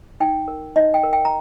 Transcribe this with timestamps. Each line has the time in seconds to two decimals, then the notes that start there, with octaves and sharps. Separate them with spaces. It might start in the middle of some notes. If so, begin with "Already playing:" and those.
0.20 D#4 G5
0.48 A#4
0.76 D#4 D#5
0.94 G5
1.03 A#4
1.13 G5
1.25 A#5